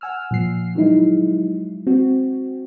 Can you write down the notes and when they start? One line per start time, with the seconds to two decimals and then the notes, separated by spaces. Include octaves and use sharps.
0.01 F#5 G#5 E6 F6
0.31 A#2 F3 C7
0.75 D#3 F#3 G#3 D#4 E4
1.87 C4 F#4